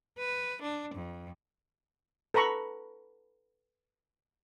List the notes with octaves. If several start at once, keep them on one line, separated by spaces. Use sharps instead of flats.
B4
D4
F2
A4 B4 A#5 B5 C#6